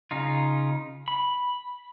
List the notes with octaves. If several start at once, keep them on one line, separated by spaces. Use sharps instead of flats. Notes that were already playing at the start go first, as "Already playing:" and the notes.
C#3 D#4 F4
B5